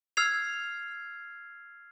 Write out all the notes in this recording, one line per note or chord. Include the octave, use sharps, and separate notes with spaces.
E6 F6 G#6 C7 F7